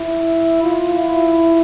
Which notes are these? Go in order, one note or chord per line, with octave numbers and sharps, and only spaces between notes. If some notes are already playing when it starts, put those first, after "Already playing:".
Already playing: E4
F4
E4